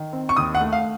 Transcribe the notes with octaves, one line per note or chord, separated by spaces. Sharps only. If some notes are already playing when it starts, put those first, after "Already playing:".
Already playing: D#3
C4
C#6
D#2 D#6
F#5
A3
F5